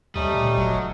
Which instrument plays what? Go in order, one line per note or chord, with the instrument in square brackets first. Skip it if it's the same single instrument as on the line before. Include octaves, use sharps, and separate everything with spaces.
[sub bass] D2 [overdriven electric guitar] G3 [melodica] A3 C#4 D#4 [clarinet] D#6
[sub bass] A#2
[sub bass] F#1 [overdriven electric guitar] F#3